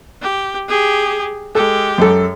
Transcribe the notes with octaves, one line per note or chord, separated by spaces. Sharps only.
G4
G4 G#4
G#3 G4 A4
F#2 A4